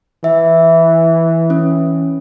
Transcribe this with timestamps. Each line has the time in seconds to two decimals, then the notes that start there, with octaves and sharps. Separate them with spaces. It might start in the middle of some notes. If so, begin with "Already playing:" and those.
0.24 E3 E5
1.50 C#4